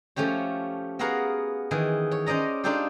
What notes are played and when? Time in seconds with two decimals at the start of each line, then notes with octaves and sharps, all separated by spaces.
0.16 F3 A3 C#4 G4 C#5
0.99 B3 F#4 G#4 A#4 F5 F#5
1.71 D#3 E3 G#4
2.11 C#5
2.26 C#4 C5 D5 D#5 A#5
2.64 D4 D#4 F4 G4 A4 C5